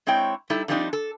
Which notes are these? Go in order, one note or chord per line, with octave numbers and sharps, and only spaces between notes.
G#3 C4 E4 C#5 G5
G3 D#4 E4 A4
D3 F3 G3 C4 D4 D#4
A4